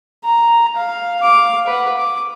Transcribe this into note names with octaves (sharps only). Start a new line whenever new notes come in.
A#5
F5
F5 D6
B4 F#5
D6